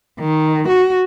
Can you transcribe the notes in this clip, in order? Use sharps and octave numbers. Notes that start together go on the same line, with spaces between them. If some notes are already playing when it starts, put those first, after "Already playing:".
D#3
F#4